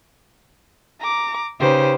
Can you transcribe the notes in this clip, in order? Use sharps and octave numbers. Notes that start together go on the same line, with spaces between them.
A#5 D6
C#3 D#4 G4 B4 C5